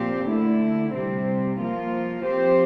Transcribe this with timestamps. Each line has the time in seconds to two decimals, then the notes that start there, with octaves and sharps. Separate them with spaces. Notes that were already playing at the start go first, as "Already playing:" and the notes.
Already playing: A#2 F3 C4 G4
0.25 D3 A3 E4
0.92 C3 G3 C4
1.59 F3 A#3 F4
2.25 F3 C4 G4 C5